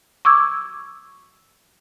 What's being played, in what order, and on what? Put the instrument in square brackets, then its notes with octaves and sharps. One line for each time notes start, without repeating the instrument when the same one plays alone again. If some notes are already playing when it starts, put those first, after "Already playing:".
[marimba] C#6 D6 E6 G#6